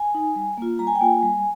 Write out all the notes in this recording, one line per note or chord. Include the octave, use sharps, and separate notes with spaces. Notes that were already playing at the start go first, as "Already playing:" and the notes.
Already playing: G#5
D#4
G3
A#3 F4
G3 A#5
G#5
G5
A#3 F4 G#5
G3